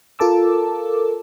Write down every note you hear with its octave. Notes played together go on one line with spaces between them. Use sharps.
F4 A4 A#4 A5 D6 E6